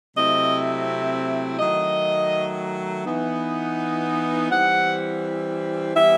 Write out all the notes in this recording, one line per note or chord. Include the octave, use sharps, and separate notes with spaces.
C3 F#3 A3 C4 E4 D#5
D#3 F#3 A3 D#5
E3 B3 D#4
E3 G3 C4 F#5
E3 G3 B3 E4 E5